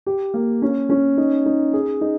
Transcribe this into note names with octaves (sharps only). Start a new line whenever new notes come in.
G4
A#3
C#4
C#4
D#4
D#4
G#4
D#4